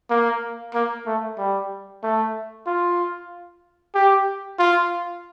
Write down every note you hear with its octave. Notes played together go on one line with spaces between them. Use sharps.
A#3
A#3
A3
G3
A3
F4
G4
F4